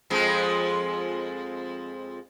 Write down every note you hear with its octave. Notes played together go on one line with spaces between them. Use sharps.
F2 F3 G#3